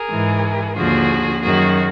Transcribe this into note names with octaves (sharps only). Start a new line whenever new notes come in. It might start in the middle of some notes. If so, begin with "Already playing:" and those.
Already playing: G#4 A#4
G#2 E3
D#2 D3 F3 F#4 G#4
F#2 D#3 F#4 G#4